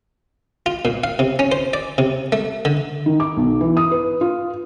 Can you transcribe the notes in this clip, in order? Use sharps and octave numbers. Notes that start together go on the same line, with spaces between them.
F4
A#2
F5
C3
C#4
C5
D5
C3
A3
D3
D#3
D6
B1
E3
D#6
B4
F4